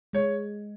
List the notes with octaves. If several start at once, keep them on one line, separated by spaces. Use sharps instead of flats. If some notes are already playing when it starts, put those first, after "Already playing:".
G#3 C#5